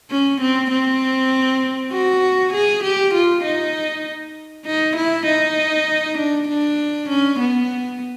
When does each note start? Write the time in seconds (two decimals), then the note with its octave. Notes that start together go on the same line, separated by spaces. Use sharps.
0.10 C#4
0.41 C4
0.71 C4
1.92 F#4
2.53 G#4
2.84 G4
3.14 F4
3.44 D#4
4.67 D#4
4.96 E4
5.26 D#4
6.18 D4
6.48 D4
7.09 C#4
7.39 B3